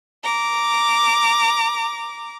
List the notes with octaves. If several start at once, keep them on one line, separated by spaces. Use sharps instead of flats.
A#5 D6